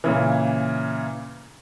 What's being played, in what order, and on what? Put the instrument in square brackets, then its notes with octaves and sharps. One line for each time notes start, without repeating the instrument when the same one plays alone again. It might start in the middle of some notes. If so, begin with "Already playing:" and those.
[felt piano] A#2 C#3 E3